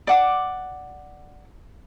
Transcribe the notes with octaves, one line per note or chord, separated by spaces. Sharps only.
D5 F#5 D6